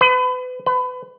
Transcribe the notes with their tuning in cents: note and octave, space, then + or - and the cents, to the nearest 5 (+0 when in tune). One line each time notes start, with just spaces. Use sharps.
B4 +35
B4 +30